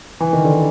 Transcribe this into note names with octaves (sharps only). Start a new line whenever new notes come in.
E3
D#3
D3